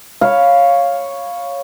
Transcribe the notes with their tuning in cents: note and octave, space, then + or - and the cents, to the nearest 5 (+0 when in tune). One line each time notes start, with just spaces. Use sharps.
C#5 +0 F5 +0 B5 +0